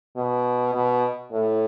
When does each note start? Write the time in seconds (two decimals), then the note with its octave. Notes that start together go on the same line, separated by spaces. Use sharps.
0.16 B2
0.74 B2
1.32 A2